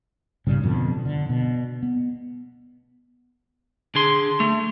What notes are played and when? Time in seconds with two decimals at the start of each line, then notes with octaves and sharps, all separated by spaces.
0.47 B1 G#2 C#3 G3
0.63 F1 F2 B2 D3
1.05 D3
1.29 B2
1.83 B3
3.95 D3 G#4 C6
4.40 A3